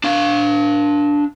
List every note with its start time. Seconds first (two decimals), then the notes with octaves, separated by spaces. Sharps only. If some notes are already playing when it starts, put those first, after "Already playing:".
0.04 D4 F5